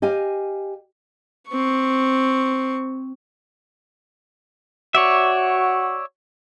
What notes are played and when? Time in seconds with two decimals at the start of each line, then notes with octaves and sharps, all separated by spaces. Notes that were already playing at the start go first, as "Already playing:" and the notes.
0.02 G4 D#5 F5 G#5
1.49 C4 C#6
4.95 F#4 C#5 D5 E5